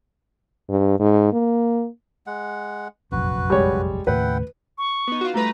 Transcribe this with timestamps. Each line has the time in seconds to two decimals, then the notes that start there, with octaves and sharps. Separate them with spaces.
0.69 G2
0.99 G#2
1.32 A#3
2.27 G#3 F#5
3.12 F1 A#1 F#2 F#4 B4
3.50 G3 G#3 C#5
4.07 D#2 A2 C#3 E4 B4 F#5 G5
4.78 C#6
5.08 B3 D#4
5.21 F4 F#4
5.34 G3 A3 B4 A#5